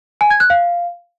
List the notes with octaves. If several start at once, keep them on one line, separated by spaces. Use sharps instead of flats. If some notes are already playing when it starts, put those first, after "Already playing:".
G#5
G#6
F#6
F5